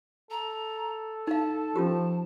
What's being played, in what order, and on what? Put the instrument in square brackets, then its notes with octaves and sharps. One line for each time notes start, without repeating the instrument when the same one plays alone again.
[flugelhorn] A4 [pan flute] A#5
[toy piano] D#4 F5 [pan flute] A5
[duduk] F3 [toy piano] C#4 F4 G4